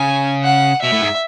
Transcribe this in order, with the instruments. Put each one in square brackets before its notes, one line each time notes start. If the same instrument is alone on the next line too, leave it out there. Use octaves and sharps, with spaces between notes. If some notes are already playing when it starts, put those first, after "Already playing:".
Already playing: [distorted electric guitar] C#3 [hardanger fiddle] G#5
[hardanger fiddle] F#5
[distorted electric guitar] B2 [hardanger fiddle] E5
[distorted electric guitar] A2
G#2